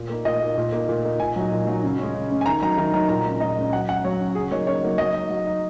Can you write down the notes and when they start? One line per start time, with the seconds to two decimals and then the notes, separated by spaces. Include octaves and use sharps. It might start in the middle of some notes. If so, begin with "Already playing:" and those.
Already playing: A#2
0.09 A#3 D#4
0.25 A#2 D#5
0.42 A#3 D#4
0.58 A#2
0.72 A#3 D#4
0.89 A#2
1.04 A#3 D#4
1.20 A#2 G#5
1.36 F#3 D#4
1.52 A#2
1.67 F#3 D#4
1.83 C#3
1.99 G#3 C#4
2.15 C#3
2.31 G#3 C#4
2.41 G#5
2.46 D#3 A#5
2.62 F#3 D#4 A#5
2.78 D#3 A#5
2.94 F#3 D#4 A#5
3.09 A#2 A#5
3.25 G#3 C#4
3.40 A#2 D#5
3.57 G#3 C#4
3.72 F#3 F#5
3.89 C#4 F#5
4.04 F#3 C#5
4.20 C#4
4.35 C#3 G#4
4.51 F#3 A#3 D#4 C#5
4.67 C#3 C#5
4.83 F#3 A#3 D#4
4.98 F#3 D#5
5.14 D#4
5.30 F#3
5.46 D#4